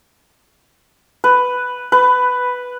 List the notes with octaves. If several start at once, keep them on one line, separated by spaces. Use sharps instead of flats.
B4
B4